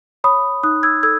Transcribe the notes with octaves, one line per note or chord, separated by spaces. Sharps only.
C#5 B5 D#6
D#4 D#6 F#6
E6 G#6
A4 E6 G#6